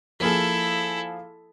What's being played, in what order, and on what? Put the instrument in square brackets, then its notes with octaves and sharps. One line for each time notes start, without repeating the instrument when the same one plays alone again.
[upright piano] F3 A#3 G#4 [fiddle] E4 A4